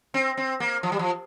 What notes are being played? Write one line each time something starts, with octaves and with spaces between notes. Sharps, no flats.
C4
C4
A#3
F3
G3
F3